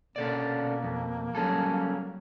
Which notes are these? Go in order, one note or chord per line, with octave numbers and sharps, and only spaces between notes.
B2 A#3 C#4 A4 D5
F2
F#3 G3 C#4 G#4 A4